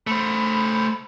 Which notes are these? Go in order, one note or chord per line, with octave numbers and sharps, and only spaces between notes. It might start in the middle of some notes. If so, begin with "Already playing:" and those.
A3 C5 B5